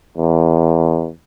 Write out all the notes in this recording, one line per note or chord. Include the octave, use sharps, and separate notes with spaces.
E2